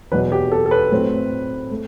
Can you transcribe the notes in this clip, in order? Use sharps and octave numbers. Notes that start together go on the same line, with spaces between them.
E2 B2 F#3 B4
G4
A4
A4
B4
A2 F#3 A3 C4
A3